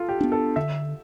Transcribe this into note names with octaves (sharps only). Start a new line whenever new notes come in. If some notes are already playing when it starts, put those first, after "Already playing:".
Already playing: F4 A4
G4
B3 D4
A4
D3 E5